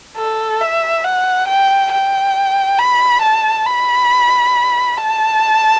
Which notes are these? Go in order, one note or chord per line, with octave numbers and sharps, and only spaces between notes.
A4
E5
F#5
G5
G5
B5
A5
B5
A5